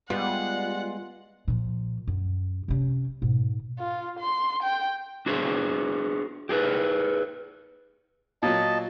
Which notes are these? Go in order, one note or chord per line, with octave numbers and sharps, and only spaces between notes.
G3 G#3 B3 F4 F#5
A#2 F3
F#2
C3 C#4
G#2 B2
F4
C6
G5
D4 F#4 G#4 C5
G4 G#4 B4
A#2 F#3 D#5 A5